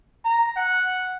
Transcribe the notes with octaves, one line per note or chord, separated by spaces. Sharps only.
A#5
F#5